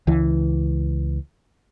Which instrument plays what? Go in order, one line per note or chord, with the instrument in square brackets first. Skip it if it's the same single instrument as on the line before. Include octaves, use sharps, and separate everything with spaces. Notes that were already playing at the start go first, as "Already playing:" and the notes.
[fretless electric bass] C#2 E3